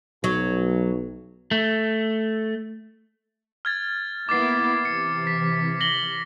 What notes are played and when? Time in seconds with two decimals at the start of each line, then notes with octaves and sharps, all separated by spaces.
0.24 B1 F#3
1.51 A3
3.65 F6 G#6 A6
4.29 A#3 B3 E4 D6 A6 C7
4.85 C3 E3 C#7
5.27 B6
5.81 A#6 F#7 G7